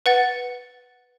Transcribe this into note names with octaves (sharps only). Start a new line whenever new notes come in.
B4 F#5 A6